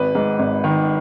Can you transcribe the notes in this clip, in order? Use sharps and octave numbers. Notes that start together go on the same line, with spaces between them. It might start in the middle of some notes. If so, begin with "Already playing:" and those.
Already playing: G#1 B4
G#2
G#1
D#3